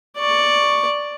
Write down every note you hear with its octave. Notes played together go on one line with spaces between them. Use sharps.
D5 C#6